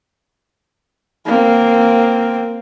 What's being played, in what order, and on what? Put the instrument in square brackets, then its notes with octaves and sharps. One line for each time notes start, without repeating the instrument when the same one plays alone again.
[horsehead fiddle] A#3 C4